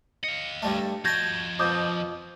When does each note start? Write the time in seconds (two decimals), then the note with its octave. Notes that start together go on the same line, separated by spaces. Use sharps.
0.24 D#5 F5 C#7
0.62 G2 G3 A3
1.05 F3 F#4 D#5 A5 G6 G#6 A#6
1.59 F2 B2 D6 D#6 G6